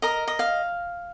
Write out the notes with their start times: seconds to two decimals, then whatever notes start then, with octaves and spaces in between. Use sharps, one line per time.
0.02 A#4 D#5
0.27 D#5
0.39 F5